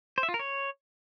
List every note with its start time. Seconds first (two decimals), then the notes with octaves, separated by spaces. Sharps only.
0.18 C5
0.23 E5
0.29 F4
0.34 A#4
0.39 C#5